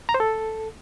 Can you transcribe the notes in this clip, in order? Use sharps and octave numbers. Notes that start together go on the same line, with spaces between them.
A#5
C5
A4